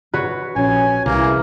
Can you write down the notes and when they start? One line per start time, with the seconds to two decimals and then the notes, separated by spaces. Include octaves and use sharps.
0.13 F#4 B4 C#5
0.56 A#1 C#4 G#5
1.06 C2 C#3 E3 A#3